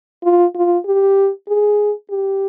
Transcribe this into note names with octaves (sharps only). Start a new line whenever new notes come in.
F4
F4
G4
G#4
G4